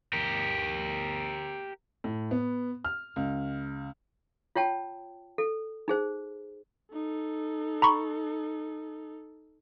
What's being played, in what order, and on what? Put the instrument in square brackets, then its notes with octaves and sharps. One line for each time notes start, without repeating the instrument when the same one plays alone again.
[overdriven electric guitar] G4 A#4
[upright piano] A2
B3
F6
C#2
[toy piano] F4 C#5 G5 A5
A4
D#4 G#4 C5
[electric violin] D#4 A4
[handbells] A#5 B5 C#6